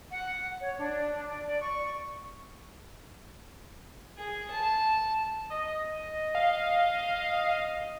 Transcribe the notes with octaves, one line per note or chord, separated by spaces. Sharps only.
F#5
C#5
D4
D5
D5
C#6
G#4
A5
D#5
F5